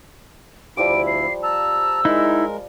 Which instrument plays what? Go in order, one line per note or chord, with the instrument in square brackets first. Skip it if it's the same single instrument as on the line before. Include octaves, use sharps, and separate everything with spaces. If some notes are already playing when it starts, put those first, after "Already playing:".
[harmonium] D2 E4 [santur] F3 G3 D6 [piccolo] D7
[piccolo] C7
[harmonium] A5 A#5 [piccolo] E6
[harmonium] G#3 A#4 [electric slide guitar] D#4 E4